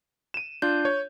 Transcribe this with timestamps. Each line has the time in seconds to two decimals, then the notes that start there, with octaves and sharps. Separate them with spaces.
0.34 D#7 E7
0.62 D4 F4 G6
0.85 C#5